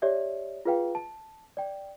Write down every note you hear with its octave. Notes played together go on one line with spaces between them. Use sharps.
G4 C#5 D5 E5
F4 G#4 B4 F5 G5
A5
D5 G5